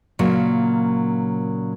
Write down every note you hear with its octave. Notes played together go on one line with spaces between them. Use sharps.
A#2 C#3 F#3 A#3